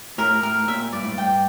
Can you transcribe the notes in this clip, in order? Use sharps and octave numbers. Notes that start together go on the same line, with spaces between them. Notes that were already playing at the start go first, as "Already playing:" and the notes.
A2 A#4
A2 A#4
A#2 E5
G2 D5
A2
G2
G5